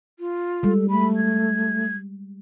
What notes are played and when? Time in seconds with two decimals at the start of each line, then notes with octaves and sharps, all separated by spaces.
0.19 F4
0.63 G3 G#3 A4
0.90 A3 B5
1.17 G#6